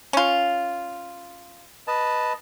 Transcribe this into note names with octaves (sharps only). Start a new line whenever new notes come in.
C#4 F4
B4 D#5 A5